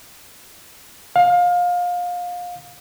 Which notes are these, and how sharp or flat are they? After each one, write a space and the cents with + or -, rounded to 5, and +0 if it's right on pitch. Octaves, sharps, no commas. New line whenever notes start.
F5 +25